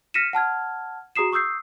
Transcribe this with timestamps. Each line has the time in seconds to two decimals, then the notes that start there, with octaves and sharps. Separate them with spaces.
0.14 F6 A#6 B6 C#7 D#7 E7
0.33 F#5 A5 F6 G#6
1.16 F#4 G#4 A#5 D#6 C7 E7
1.32 C#6 D#6 E6 G6 C7